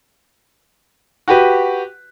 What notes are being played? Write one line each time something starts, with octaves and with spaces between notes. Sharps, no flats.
F#4 G4 B4